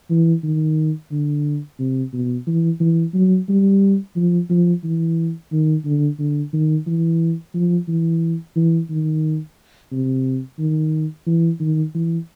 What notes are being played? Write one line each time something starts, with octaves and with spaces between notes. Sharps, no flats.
E3
D#3
D3
C3
B2
E3
E3
F#3
G3
F3
F3
E3
D#3
D3
D3
D#3
E3
F3
E3
E3
D#3
C3
D#3
E3
D#3
E3